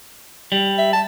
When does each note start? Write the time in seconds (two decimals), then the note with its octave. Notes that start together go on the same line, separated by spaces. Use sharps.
0.52 G3
0.78 E5
0.93 A5